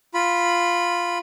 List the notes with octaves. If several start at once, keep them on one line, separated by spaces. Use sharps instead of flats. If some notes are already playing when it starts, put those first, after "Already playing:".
F4 B5